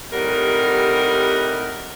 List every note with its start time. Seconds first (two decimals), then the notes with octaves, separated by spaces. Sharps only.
0.13 A2 C3 G3 D#4 A#4 F#5